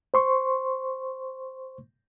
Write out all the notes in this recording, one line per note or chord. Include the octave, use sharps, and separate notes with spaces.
C5 C6 C#6